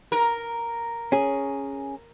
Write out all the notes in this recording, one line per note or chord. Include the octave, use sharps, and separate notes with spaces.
A#4
C#4 G#4